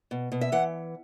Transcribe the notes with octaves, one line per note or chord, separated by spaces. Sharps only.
B2
B2
E5
E3 F#5